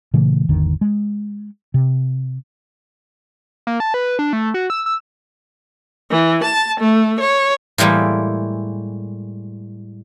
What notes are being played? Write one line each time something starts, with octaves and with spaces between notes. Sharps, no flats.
A#2 C#3 E3 A3
G#1 E2 D3 D#3
G#3
C3
A#3
A5
B4
D4
A3
F#4
E6
E6
E3
A5
A3
C#5
A2 E3 G3 G#3 A#3